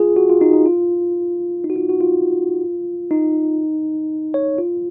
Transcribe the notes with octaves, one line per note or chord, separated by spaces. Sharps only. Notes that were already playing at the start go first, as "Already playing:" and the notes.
Already playing: F4 G#4
F#4
F4
D#4
D#4
F4
D#4
F#4
F4
F#4
F4
D#4
C#5
F4